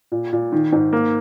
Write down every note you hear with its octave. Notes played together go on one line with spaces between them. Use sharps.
A#2
A#2
D#3
G#2
A#3